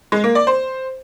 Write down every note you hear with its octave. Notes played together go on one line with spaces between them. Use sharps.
G#3
A#3
D5
C5